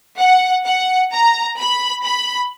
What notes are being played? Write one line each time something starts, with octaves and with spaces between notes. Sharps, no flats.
F#5
F#5
A#5
B5
B5